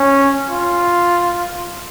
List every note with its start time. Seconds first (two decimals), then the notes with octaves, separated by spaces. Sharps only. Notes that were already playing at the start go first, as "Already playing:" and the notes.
Already playing: C#4
0.50 F4